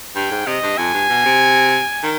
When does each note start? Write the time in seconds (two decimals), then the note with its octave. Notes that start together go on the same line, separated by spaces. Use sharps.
0.16 G2 G5
0.31 G#2
0.47 C3 D#5
0.63 G2
0.78 F2 G#5
0.94 G2
1.10 B2
1.25 C3
2.03 D#3